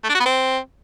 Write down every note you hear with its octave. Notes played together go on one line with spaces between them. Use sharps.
A3
D4
F#4
B3
C4